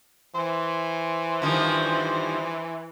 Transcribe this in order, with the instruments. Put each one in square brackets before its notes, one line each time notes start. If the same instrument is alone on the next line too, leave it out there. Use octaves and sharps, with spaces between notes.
[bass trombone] E3 [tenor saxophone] C5
[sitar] G2 D#3 F3